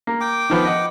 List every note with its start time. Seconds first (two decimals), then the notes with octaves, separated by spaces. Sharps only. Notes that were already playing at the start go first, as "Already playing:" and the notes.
0.07 A#3
0.21 G5 D6
0.50 D#3 F3 B3
0.65 D#5 F#5